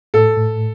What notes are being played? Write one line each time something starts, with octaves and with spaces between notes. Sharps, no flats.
A2 A4
A2